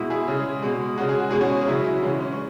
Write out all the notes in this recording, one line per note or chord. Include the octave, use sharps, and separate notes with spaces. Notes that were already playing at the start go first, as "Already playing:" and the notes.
Already playing: B2 G#3 E4
E4 G#4
C#3 G#3
B2 G#3
C#3 G#3 F#4
G#4
F#4
B2 G#3 G#4
C#4 F#4
C#4
C#3 F#3 E4
E4
C#3 E3 G#3 C#4
C#4
C#4